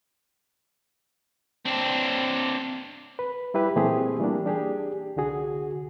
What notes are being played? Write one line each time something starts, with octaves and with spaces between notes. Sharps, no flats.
C4 D4
B4
G3 E4 G4 B4
A#2 E3 A3 C4 G4 G#4
E3 G3 A#3 D4
D4 G4 G#4
C2 D3 F#4 G#4